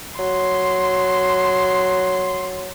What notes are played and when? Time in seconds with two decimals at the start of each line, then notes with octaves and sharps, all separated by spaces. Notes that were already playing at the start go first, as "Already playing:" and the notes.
0.19 F#3 C6